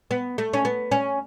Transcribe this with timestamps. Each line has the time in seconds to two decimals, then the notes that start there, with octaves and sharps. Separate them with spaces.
0.11 B3
0.38 A3
0.53 C#4
0.65 B3
0.91 C#4